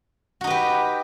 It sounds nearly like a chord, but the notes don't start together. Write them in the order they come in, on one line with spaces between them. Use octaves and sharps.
F#4 D#4 B4 G4